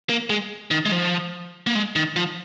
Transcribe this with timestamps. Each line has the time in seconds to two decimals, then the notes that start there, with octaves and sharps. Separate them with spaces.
0.10 A#3
0.30 G#3
0.71 D#3
0.85 G#3
0.92 F3
1.67 A#3
1.75 G#3
1.96 D#3
2.16 F3